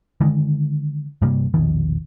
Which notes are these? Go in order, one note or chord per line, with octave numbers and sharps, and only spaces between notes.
D3 D#3 G#3
G2 C3 G3 A#3
E1 A#1 B2 D#3